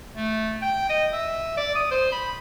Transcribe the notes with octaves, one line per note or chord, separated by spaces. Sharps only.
A3
G5
D#5
E5
D5
D#6
C5
B5